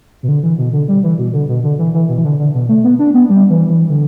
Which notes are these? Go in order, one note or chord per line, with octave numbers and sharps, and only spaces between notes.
B2
D3
E3
B2
D3
G3
E3
B2
D3
B2
D3
E3
E3
B2
E3
D3
D3
B2
A3
B3
D4
B3
G3
E3
E3
D3